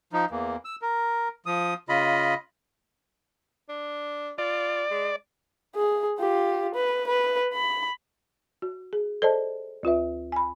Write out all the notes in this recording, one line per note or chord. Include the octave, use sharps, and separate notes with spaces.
F3 D#4
E2 E3 A#3
E6
A#4
F3 D#6
C#3 F4 D#5 B5
D4
F4 D5
G#3
G#4
F4 G4
B4
B4
B5
F#4
G#4
A4 C5 D5 D#5 A5
D2 F4 B4 E5
G#5 B5